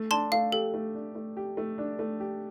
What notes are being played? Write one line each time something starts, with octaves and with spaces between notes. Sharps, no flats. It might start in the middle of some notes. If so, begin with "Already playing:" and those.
Already playing: A3
D4 A5 C6
A3 F5
G4 A4
A3
D4
A3
G4
A3
D4
A3
G4